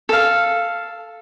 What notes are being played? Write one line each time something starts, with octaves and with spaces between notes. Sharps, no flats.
A4 F5